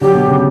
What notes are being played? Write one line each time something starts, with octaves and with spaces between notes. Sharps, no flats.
D3 F#3 G4
B2
C#3